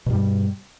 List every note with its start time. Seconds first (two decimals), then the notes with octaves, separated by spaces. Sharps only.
0.06 B2
0.10 G2
0.13 G3